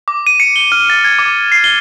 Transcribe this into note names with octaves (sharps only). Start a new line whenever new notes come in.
D6
D#7
C#7
G7
F6
A6
G#6
D6
C7
G7